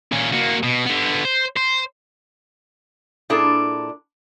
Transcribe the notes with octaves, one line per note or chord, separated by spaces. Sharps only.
A#2 C#4
A#3 F#4
B2
D3 B3
C5
C5
A#2 D4 E4 G#4 A4